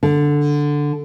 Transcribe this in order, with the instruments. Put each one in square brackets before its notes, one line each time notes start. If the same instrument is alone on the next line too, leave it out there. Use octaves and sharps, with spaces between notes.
[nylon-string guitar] D3